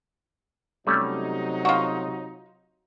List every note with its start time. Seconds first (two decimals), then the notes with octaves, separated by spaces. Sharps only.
0.87 C3 F#3 G3 A3 C#4 D#4
1.65 F4 F#4